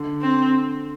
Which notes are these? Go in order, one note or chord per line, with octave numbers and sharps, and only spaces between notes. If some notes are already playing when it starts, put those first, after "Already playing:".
Already playing: D3
C4